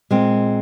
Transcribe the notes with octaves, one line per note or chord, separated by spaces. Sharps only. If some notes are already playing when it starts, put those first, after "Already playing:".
A#2 G#3 C4